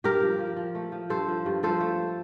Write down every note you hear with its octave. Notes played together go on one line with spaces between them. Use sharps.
G2 G4 A#4
F3
F3
F3
A3
F3
G2 A4 C5
F3
G2
F3 A4 C5
A3